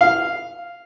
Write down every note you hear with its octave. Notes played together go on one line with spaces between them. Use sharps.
F5